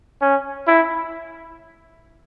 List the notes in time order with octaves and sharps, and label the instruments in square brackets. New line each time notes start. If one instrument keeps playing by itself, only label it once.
[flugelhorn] C#4
E4